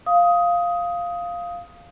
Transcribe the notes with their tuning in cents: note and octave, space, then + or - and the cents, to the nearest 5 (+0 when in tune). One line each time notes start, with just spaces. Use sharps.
F5 +0 D#6 +15